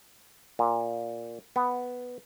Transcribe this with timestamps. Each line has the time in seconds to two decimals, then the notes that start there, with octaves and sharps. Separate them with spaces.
0.59 A#2
1.56 B3